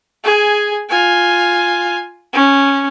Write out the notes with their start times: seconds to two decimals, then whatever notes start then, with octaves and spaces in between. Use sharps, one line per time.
0.24 G#4 G#5
0.89 F4 G#5
2.33 C#4